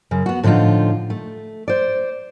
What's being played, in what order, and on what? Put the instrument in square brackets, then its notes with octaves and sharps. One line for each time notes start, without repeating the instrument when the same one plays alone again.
[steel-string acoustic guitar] F#2 C#3
B3 F#4
A2 D3 F3 D#4 F4
A3
C5 D5